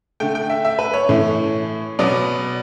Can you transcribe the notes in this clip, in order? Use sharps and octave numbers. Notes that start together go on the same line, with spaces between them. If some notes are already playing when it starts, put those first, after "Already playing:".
D3 A3 G5
G5
E5
E5
B4
C#5
A2 E3 A3
B2 F#3 B3 D5